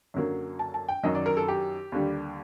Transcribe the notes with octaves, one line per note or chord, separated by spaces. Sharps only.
F#2 D3 F#3 A#3
A5
A5
G5
F#2 D#3 F#3 D#5
D5
A#4
A4
G4
D#2 D3 G3